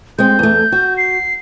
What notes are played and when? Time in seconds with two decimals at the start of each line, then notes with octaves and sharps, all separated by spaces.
0.18 G#3 C4 G6
0.39 E2 A3
0.72 F#4
0.97 C7